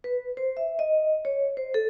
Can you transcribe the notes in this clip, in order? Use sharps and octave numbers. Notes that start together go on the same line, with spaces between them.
B4
C5
E5
D#5
C#5
C5
A4